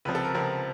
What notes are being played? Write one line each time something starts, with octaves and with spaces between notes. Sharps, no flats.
C#2 C3 F3 B4
A4
A#4
C#2 C3 F3 A#4